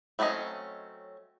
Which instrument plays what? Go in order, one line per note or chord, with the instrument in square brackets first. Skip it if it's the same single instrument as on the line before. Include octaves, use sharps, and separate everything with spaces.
[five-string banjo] F#3 A3 C4 C#4 D#5